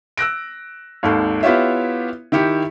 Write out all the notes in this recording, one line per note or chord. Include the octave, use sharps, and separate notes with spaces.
E6 F#6 A#6 D7
G#1 D#2 A4
B3 E4 F4 G4 C#5 E5
D#3 E4 G4 C#7